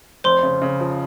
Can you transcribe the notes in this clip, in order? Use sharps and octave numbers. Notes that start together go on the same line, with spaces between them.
F1 C5 C6
C#3
C#3
F3